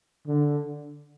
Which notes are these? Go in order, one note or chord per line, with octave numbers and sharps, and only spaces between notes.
D3